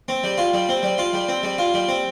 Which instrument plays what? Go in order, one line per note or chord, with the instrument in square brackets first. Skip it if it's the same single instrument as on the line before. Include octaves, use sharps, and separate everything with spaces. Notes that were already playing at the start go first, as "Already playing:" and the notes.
[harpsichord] C4
G3
F4
G3
C4
G3
F4
G3
C4
G3
F4
G3
C4